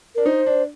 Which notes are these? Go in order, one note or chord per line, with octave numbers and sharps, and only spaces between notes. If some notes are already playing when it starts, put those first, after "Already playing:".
D4 A#4
D#4 C5
D4